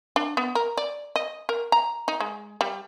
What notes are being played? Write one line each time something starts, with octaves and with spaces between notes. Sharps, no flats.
D4
B3
A#4
D5
D#5
A#4
A#5
D#4
G#3
G3